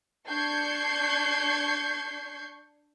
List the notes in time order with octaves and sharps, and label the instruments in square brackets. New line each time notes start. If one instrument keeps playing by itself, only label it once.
[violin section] D4 C#6 G6 G#6 C7